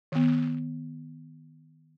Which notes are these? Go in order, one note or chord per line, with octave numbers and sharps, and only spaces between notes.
D#3 B3